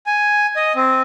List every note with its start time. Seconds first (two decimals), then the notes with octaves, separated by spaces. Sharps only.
0.06 G#5
0.56 D#5
0.76 C4